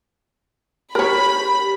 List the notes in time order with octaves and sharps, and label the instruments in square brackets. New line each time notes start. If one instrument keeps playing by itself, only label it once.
[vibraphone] G4 [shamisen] A#4 C#5 [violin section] B5